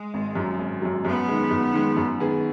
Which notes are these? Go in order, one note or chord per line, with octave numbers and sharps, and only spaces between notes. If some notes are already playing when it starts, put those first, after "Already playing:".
Already playing: G#3
G#1
F#2 F#3
G#1
F#2 F#3
F#2 B3
D#3 G#3
F#2
D#3 G#3
F#2
D#3 B3 G#4